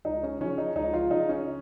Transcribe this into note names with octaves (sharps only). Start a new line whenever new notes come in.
C#2 D#4
C#4
C#3 F3 C#4
D#4
C#2 D#4
F4
C#3 F3 D#4
C#4